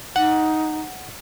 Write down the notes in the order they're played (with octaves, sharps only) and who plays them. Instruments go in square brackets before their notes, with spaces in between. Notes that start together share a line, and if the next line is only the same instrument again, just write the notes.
[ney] D#4 [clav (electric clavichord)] F#5